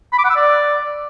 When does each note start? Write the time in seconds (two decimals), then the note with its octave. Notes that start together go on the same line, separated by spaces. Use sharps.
0.12 B5
0.18 D6
0.24 F#5
0.30 E6
0.36 D5